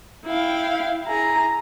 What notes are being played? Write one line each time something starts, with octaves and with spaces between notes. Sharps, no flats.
E4 F5 G5
E4 G#4 A#5